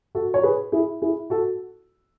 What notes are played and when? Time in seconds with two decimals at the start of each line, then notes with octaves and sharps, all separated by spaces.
0.15 F#4 A4
0.34 C#5
0.43 G#4 B4
0.72 E4 G#4
1.02 E4 G#4
1.30 F#4 A4